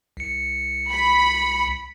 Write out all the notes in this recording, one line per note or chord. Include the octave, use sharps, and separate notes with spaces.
C2 C#7
B5